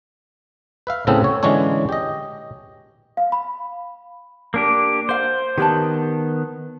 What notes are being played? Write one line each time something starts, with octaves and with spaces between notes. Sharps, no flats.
B4 E5 F5
A2 C#3 B3 C4 A4
C#5
D3 E3 G#3 C#4 D4 C#5
G4 D#5
F5
B5
A#3 D4 G4
A#4 C5 F5
D#3 B3 G4 C#5 A5